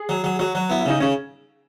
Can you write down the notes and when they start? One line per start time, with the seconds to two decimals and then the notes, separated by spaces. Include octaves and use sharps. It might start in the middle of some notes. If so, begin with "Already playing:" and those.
Already playing: G#4
0.09 F#3
0.24 F#3
0.39 F#3 F#4
0.55 F#3
0.70 B3 E4
0.80 E4
0.86 C#3 D#4
1.00 C#3 C#4